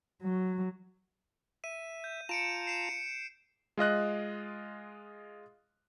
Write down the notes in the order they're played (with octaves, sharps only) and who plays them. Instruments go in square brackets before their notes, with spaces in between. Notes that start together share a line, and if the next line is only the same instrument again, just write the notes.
[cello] F#3
[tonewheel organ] E5 [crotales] D#7
[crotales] G6
[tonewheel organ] F4 A5 A#5 [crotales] C#7 D7 E7
[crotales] C7 D7 E7
[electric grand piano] G#3 F4 D#5 F#6